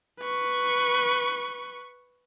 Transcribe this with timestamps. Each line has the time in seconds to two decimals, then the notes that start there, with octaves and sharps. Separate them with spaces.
0.20 B4 C#6